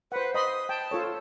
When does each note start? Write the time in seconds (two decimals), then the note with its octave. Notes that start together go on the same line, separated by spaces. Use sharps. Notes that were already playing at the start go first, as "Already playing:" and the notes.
0.12 B4 C5 F#5
0.34 D#5 B5 C6 D#6
0.69 G5 A5
0.91 F4 A4 C#5